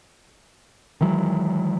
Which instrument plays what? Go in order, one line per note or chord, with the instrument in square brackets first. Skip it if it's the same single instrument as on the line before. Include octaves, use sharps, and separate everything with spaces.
[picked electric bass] D#3 E3 F#3 G#3